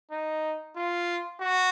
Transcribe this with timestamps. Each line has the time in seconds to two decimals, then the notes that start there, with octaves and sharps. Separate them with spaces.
0.11 D#4
0.76 F4
1.40 F#4